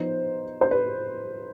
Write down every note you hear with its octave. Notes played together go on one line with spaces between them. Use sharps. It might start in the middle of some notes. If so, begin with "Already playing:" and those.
Already playing: F3 B3 D#4 C5
C5
B4